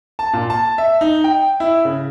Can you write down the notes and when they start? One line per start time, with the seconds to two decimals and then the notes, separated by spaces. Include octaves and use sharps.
0.19 A5
0.33 A#2
0.50 A5
0.78 E5
1.01 D#4
1.24 G5
1.60 E4
1.85 C#3